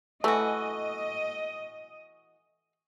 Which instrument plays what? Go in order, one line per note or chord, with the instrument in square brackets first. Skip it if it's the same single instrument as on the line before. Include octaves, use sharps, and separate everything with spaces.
[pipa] E3 F#4 [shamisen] A3 [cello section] D#5 [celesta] G#5 C#6 E6